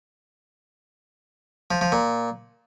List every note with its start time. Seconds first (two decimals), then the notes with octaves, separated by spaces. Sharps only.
1.71 F3
1.81 F3
1.92 A#2